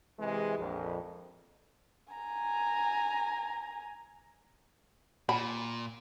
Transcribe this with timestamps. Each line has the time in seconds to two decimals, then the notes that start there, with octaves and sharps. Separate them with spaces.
0.19 C3 E3 G#3
0.58 A#1 F2
2.13 G#5 A#5
5.29 A#2 B5